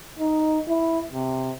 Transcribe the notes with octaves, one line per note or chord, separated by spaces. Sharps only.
D#4
E4
C3